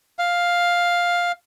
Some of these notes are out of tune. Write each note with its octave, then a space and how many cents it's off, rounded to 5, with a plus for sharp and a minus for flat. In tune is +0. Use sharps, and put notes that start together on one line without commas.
F5 +5